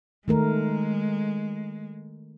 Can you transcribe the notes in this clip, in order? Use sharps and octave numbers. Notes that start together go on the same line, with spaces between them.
D#3 G#3 A3 A#4